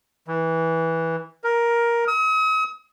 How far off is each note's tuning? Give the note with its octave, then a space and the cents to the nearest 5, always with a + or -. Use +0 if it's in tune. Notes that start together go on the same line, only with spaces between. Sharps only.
E3 -15
A#4 +10
D#6 +45